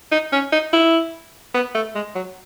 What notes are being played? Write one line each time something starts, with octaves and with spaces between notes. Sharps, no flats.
D#4
C#4
D#4
E4
B3
A3
G#3
F#3